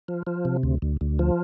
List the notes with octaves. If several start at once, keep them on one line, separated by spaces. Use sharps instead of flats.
F3
F3
C3
D2
D2
D2
F3